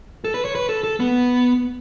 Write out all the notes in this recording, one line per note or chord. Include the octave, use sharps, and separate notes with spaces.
A4
B4
C#5
B4
A4
A4
B3